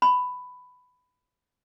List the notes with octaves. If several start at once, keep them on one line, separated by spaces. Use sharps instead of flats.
B5